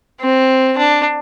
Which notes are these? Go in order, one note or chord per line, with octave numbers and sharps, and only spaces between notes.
C4
D4